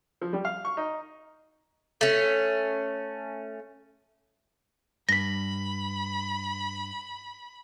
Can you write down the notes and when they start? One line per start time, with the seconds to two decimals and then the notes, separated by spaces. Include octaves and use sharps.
0.21 F3
0.33 G3
0.45 F5
0.65 C#6
0.77 D#4
2.01 A3 C#4
5.09 G2 B5 A#6 B6